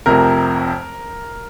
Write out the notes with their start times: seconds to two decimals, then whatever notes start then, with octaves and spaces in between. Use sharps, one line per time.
0.06 F1 F2 C3 A#4